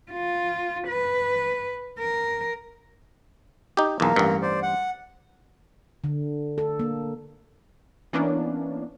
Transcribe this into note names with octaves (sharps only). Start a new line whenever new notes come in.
F4
B4
A#4
D#4 G4
B1 E2 A#3 A#4
A1 G2
C5 D5
F#5
D3
A4
A#3
E3 A#3 B3 C#4 D4